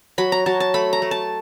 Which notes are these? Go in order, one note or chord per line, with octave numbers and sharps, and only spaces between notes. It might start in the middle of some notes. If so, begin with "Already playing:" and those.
F#3 B5
A#5
F#3 A5
A5
A3 B5
A#5
A3
A5